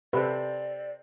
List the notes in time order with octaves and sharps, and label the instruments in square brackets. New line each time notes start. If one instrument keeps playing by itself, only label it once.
[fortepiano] C3 C4 A4 [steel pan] B4 [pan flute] D5